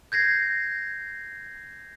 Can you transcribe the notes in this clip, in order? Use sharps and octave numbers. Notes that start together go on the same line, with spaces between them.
G6 G#6 A#6 C7